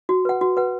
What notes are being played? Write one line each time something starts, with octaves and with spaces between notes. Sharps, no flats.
F#4
B4 F#5
F#4
B4 F#5